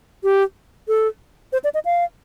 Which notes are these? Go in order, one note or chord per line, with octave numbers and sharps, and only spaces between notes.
G4
A4
C5
D5
D#5
F5